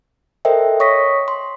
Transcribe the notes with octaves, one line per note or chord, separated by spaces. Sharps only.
A4 A#4 C5 D#5 E5 G5
C#5 C#6 D#6 A#6 B6
C6